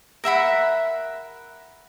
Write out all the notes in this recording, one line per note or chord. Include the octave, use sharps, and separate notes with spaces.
A#4 E5 F#5 B5